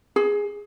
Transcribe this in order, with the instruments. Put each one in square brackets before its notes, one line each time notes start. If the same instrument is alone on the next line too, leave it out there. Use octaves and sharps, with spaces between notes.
[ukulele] G#4